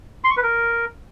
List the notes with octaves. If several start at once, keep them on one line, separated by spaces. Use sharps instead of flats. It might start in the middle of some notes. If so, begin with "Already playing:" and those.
C6
C#6
B4
A#4